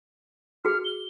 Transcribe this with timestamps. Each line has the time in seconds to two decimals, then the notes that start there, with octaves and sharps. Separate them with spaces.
0.65 F#4 G#4 F6
0.85 G7